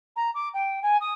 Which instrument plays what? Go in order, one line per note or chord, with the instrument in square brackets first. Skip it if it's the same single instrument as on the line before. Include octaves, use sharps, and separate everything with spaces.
[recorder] A#5
D6
G5
G#5
D#6